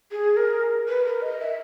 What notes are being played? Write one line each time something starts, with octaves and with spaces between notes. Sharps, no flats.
G#4
A#4
B4
A#4
D#5
E5